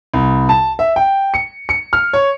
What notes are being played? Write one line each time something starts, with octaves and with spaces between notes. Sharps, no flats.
C2
A5
E5
G5
C#7
C#7
F6
C#5